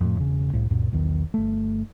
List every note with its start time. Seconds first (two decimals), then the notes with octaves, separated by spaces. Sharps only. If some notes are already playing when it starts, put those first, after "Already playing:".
0.01 F2 A2
0.18 E1 C#3
0.53 C2 A2
0.70 C#2 F#2 A#2
0.92 B1 E2 D#3
1.34 G1 A3